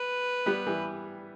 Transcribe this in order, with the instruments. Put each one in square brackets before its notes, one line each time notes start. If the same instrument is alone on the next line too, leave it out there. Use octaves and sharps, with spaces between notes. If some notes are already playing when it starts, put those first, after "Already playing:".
Already playing: [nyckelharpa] B4
[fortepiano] G3 B3
E3 G3